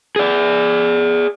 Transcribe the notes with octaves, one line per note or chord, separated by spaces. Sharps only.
G#4 D5